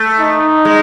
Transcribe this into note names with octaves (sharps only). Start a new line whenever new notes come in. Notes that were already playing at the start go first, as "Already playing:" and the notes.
Already playing: A3
D#4
G#3